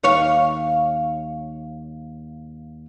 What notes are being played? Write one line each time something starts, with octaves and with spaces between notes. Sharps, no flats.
D#2 C#5 F5